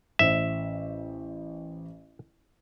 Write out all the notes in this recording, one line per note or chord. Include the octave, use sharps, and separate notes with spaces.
A1 C5 E5